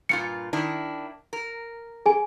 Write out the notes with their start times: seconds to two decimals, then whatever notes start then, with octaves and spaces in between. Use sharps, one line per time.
0.09 G2 A#2 F4 C#7
0.53 D#3 D4 E4
1.33 A#4
2.06 G#4 G#5